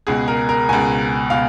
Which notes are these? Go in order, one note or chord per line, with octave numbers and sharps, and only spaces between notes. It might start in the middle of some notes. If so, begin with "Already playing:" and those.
C#2 B2 G#4
A#4
A#4
C#2 B2 G#5
B2 F5